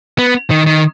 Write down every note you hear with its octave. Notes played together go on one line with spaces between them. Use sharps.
B3
D#3
D#3